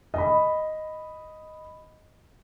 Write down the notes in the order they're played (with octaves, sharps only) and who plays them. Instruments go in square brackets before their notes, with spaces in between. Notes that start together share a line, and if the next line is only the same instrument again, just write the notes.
[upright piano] D#5 B5